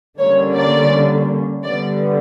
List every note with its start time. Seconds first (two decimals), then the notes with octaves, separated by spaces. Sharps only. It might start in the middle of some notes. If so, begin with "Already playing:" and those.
0.19 D3 G3 A#3 C#4 C#5
0.55 D5
1.64 D3 G3 B3 D5